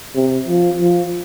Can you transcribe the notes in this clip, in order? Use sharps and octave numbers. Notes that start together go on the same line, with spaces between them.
C3
F3
F3